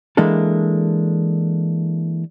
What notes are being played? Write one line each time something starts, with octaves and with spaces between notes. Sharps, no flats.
E3 G#3 A#3 D4 A4